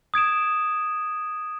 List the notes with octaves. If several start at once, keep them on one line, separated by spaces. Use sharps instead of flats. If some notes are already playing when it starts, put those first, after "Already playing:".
D#6 G#6 D7 E7